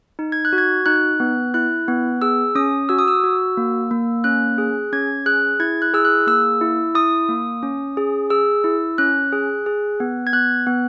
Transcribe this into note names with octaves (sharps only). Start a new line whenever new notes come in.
D#4
G#6
F#6
F#4
G#6
D#4 F#6
B3
E4 F#6
B3
G#4 E6
C#4 D#6
F#4 E6
D#6
E6
F#4
A#3
A#3
C#4 F#6
G#4
C#4 G#6
G#4 F#6
E4 G#6
F#6
G#4 E6
F#6
A#3 E6
E4
E4 D#6
A#3
C#4
G#4
G#4 E6
E4
C#4 F#6
G#4
G#4
B3
G#6
B3 F#6
B3